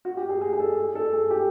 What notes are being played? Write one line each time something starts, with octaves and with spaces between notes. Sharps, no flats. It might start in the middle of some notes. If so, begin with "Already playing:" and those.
F#4
G4
G#4
G#4
G#4
A4
A4
G#4
G4